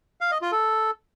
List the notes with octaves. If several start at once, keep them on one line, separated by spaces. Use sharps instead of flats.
F5
D#5
F4
A4